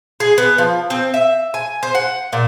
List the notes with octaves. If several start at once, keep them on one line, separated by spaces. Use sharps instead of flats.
G#4
B3
F3
C4
E5
G#5
C5
F#5
A#2